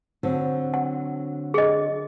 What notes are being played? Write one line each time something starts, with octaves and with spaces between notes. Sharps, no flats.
D3 F#3 C4
F#5
G#4 D#5